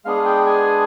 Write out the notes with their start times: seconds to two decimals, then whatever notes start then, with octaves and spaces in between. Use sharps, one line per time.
0.05 G#3 B3 D4 G#4 F5
0.25 G5
0.46 G#5